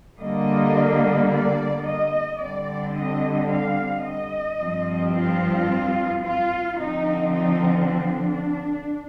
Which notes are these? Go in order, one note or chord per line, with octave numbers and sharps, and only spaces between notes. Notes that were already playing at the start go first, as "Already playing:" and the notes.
D3 G3 A#3 D#5
D5
D#5
D3 G3 C4 D5
D#5
F5
D#5
G2 F3 C4
F4
F4
D3 F3 C4 D#4
D#4
D4